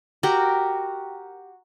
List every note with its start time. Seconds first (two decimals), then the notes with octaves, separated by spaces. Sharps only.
0.23 F#4 G4 A#4 G5